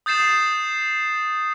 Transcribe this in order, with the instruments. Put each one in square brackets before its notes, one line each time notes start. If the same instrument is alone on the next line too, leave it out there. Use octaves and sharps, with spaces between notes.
[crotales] D#6 G6 A6 C7 E7